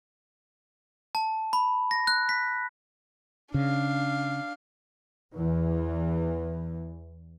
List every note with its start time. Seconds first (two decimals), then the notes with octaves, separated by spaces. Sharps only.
1.15 A5
1.53 B5
1.91 A#6
2.07 F#6
2.29 B6
3.54 C#3 D4 F5
5.34 E2 E3